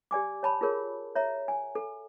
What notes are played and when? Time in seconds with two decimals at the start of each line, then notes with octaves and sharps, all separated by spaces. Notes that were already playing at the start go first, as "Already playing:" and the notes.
0.11 G4 D5 G#5 D6
0.43 C#5 A5 B5
0.61 F4 G#4 A#4 C#5
1.16 C#5 E5 A#5
1.48 G#5
1.75 A4